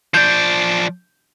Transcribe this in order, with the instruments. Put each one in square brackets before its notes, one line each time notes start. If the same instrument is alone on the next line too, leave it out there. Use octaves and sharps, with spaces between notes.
[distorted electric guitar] F3 D5 [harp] G6